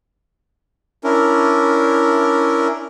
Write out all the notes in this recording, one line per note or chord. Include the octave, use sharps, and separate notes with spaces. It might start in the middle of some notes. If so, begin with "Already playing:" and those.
C#4 D4 E4 A#4